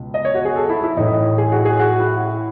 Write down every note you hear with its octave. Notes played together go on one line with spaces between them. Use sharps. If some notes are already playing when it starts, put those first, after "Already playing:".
Already playing: C#2 B2 G#3
D#5
C#5
F#4
G#4
A4
E4
E4
A1 A2 E3 D#4
G#4
F#4
G#4
F#4
E4